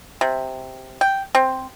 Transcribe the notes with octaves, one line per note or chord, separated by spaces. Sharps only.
C3
G5
C4